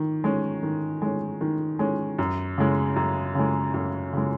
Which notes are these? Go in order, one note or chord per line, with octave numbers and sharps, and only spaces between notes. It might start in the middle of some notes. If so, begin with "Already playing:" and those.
Already playing: D#3
G#3 C#4
D#3
G#3 C#4
D#3
G#3 C#4
F#2
C#3 G#3
F#2
C#3 G#3
F#2
C#3 G#3